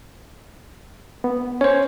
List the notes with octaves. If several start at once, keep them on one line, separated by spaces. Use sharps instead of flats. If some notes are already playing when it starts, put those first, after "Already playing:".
B3
C#4 C5 C#5